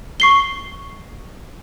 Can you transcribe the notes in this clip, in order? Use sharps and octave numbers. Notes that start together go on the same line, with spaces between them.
C#6 C7 G7